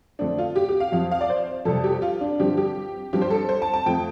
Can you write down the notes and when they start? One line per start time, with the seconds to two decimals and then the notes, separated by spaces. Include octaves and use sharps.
0.19 F2 D3 A3 C4 D4
0.38 F4
0.56 G4
0.69 G4
0.80 F5
0.92 F2 F3 C4 F5
1.11 F5
1.21 D5
1.30 C5
1.65 F2 C3 G3 A4
1.84 G4
2.02 F4
2.21 D4
2.39 G2 D3 F3 C4 G4
2.57 G4
3.13 G2 F3 C4 G4
3.22 C5
3.30 A4
3.49 C5
3.62 A5
3.73 A5
3.86 F2 F3 A3 C4 G5